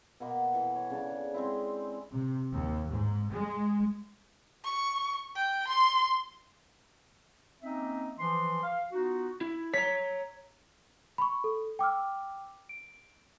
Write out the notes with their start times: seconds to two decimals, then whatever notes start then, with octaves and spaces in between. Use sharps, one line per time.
0.20 B2 A#3 B3 D6
0.54 E3 A4
0.75 C#5
0.90 C#3 D4 A5
1.34 G#3 C4 E4
2.14 C3
2.52 D#2
2.89 G#2
3.31 G#3
4.65 C#6
5.36 G5
5.67 C6
7.62 A#3 C4 C#4 D#4 D#5 E5
8.18 E3 F3 C6
8.62 F5
8.92 B3 D#4 F4 F#4
9.41 E4
9.73 C#5 A#5 B6
11.18 B5 C#6
11.44 A4
11.79 G5 D6 E6 F6
12.69 D7